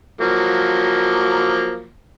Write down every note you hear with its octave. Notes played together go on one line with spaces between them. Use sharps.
F3 F#3 A#3